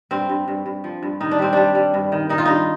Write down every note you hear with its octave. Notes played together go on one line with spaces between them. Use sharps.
G2 C4
G2
G2
G2
F3
G2
D#3 D#4
D4
G3 C4
G3 D4
G3
G2
D#3
D#3 D#4
F4
G2 D#4